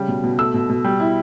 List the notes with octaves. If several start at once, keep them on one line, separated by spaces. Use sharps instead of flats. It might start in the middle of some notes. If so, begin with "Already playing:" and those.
Already playing: C#3 G3
B2
B2
A3 E6
B2
B2
G3
E4